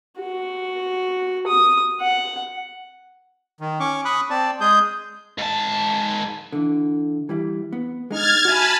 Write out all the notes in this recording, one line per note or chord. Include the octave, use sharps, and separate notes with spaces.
F#4
D#6
F#5
D#3
C#4 C#6 D6
B5 C#6 D#6 F#6
C4 D5 A5
G#3 G#4 D#6 G6
G#2 A5
D3 E3
E3 G3 E4
B3
G#3 D#4 F6 G#6 A6
F#4 D#5 E5 G#5 A5 B5